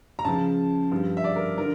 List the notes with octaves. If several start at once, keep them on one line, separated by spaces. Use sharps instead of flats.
A#5
C#2 C#3 F3 A5
G2 F3
E5
D5
A#4
D3 F3 A#4